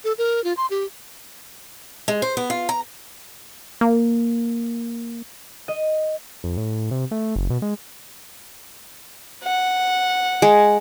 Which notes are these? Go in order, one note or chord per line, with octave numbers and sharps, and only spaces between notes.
A4
A#4
F4
C6
G4
G#3
C5
B3
F4
A#5
A#3
D#5
F2
A2
C3
A3
F#1
B2
G#3
F#5
G#3